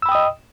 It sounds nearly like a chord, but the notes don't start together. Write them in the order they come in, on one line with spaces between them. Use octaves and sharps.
E6 B5 G5 D#6 D#5